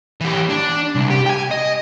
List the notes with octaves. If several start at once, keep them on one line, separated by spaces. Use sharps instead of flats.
E3 G4
D4
C2
G4
G5 G#5
D#5